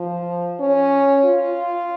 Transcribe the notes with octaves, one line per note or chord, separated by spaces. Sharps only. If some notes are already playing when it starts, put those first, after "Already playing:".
Already playing: F3
C#4
F4